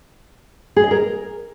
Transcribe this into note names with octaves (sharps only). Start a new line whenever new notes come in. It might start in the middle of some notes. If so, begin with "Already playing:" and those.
G#4
D#5
A#4